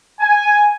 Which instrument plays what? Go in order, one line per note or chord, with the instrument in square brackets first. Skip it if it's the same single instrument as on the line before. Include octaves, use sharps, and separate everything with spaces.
[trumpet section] G#5